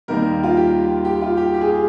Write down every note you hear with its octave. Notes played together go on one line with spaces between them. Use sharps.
D#2 D#3 G3 A#3 A#4
F4
G4
G4
F4
G4
G4
G#4
G4